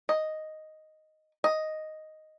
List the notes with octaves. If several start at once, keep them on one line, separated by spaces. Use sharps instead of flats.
D#5
D#5